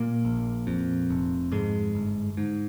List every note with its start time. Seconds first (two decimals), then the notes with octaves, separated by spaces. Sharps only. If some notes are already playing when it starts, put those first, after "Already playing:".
Already playing: A#2 A#3
0.25 A#1
0.67 F2
1.10 F1
1.52 F2 G#2 G#3
1.95 G1
2.37 G#2